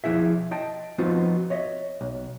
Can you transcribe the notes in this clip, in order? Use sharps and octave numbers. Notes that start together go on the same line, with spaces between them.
B1 F3 E4 G#4 E5
D#5 G5 A5
F3 B3 C4 D#4 F4 F#4
C#5 D#5 E5
B1